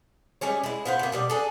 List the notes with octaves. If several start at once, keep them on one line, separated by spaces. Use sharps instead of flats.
G3 G#3 C#4 C#5
G#3 E4
B3 F4 B4 C5
C3 A#3
B2 G3 D5
D4 G#4 A4